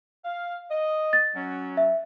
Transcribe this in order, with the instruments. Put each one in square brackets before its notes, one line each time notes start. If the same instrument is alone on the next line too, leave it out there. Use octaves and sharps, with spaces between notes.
[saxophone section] F5
D#5
[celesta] A6
[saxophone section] F#3 C#4
[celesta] E5